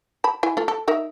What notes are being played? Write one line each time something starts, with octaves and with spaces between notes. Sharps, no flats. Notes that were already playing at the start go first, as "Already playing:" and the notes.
A5 B5
E4 G#5
A3 F4
A4
D#4 A#4 E5